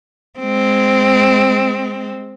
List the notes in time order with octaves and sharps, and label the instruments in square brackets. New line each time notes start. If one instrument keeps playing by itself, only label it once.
[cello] G#3 C4